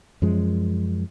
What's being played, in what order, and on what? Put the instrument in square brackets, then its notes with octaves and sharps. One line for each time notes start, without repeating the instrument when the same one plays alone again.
[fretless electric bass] F#2 F3 G#3